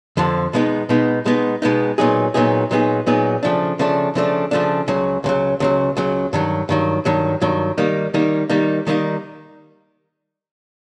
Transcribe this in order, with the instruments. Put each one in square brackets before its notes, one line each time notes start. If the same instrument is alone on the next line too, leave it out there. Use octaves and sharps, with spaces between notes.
[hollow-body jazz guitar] F2 D3 F3
B2 G#3 B3 D#4
B2 G#3 B3 D#4
B2 G#3 B3 D#4
B2 G#3 B3 D#4
A#2 F#3 B3 D#4 G#4
A#2 F#3 B3 D#4 G#4
A#2 F#3 B3 D#4 G#4
A#2 F#3 B3 D#4 G#4
C#3 F3 A3 D4
C#3 F3 A3 D4
C#3 F3 A3 D4
C#3 F3 A3 D4
C#2 C#3 F#3
C#2 C#3 F#3
C#2 C#3 F#3
C#2 C#3 F#3
G2 D#3 F#3
G2 D#3 F#3
G2 D#3 F#3
G2 D#3 F#3
D#3 G3 A#3 D#4
D#3 G3 A#3 D#4
D#3 G3 A#3 D#4
D#3 G3 A#3 D#4